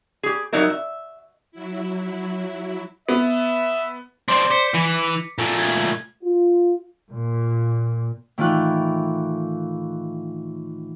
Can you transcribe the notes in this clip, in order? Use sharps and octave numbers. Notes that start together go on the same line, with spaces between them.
G4 G#4
F#3 G3 D#4 E4 A#4
E5
F#3 E4
B3 E5
C4 D4 D5 C6
C5 D6 B6 C#7
E3
A#2 A3
G#6
F4
A#2
A2 D#3 E3 F4 F#6